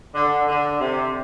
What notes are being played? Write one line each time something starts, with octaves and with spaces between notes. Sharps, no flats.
D3
D3
C3